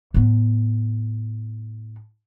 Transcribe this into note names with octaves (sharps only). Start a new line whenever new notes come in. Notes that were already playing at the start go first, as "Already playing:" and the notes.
A2 B3